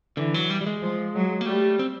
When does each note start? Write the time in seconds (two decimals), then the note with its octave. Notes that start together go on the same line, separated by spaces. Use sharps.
0.17 D3 E3
0.34 F#3
0.50 G3
0.61 G3
0.66 G#3
0.82 F3
1.15 F#3
1.41 A#3
1.46 G3 A3
1.79 C4